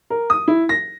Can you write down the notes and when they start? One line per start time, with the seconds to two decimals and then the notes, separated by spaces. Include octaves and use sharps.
0.10 A#4
0.30 D#6
0.48 E4
0.69 A#6